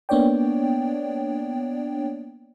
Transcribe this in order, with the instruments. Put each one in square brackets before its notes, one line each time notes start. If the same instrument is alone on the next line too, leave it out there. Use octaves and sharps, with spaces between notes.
[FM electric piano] A#3 B3 D4 C#5 D5 G5